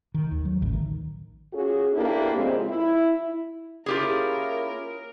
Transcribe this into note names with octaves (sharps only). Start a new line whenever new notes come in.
D#3
D#2
F#3
A1 D2
D#3
C#4 F4 F#4 G#4
A#3 B3 D4 E4 G4 A4
A#2 C#3 F3 G#3 C4
E4
A#3 C#4 E4 F4 G4 G#4 A#4